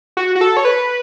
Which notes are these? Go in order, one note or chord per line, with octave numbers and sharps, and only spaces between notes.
F#4
F#4
A4
C#5
B4